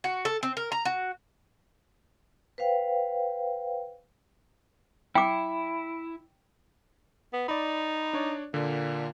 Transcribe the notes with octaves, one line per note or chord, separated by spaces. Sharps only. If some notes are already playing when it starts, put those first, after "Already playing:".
F#4
A4
C4
A#4
A#5
F#4
B4 C5 F5 G5
E4 G5 D6
B3
D#4 D5 B5
D4 C#5 D5
A#2 D3